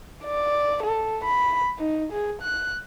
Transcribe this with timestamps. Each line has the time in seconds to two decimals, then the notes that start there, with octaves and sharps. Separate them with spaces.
0.24 D5
0.83 A4
1.24 B5
1.79 D#4
2.12 G#4
2.41 F#6